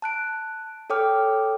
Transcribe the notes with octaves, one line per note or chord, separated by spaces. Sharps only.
A5 F#6 D7
A4 C#5 G5 D6 F6